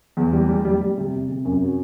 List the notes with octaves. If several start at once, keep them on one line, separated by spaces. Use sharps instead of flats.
E2
G3
G3
G3
G3
C3
C3
C3
F#2
F#3